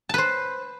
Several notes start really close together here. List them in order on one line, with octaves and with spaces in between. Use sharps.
A5 B4 C5